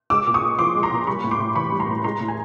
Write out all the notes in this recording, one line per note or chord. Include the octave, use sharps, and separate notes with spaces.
G#3 D6 E6
A#2
C#6 D#6
A#2
F3 C6 D6
G#3
A#5 C6
A#2
G3 B5 C#6
A2
C6 D6
A2
E3 B5 C#6
G3
A#5 C6
A2
G#3 A#5 C6
A2
G#5 A#5